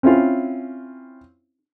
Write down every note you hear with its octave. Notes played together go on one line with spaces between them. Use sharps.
C4 C#4 E4 F4